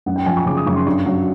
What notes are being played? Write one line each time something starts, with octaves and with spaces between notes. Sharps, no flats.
F#2 F#5
G5
F3 G#5
C#6
C#3 D6
D#6
F#2 C#6
C6
G2 C#6
F#3